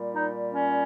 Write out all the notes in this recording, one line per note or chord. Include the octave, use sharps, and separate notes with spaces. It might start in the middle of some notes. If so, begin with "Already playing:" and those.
Already playing: A#2 G3
D#4
C#4